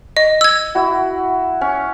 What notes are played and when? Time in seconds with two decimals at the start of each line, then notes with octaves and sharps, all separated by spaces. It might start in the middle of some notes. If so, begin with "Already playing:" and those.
0.17 D#5
0.41 E6 G#6
0.75 E4 F#4
1.61 C#4